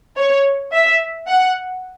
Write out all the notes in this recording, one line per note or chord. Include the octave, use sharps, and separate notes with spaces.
C#5
E5
F#5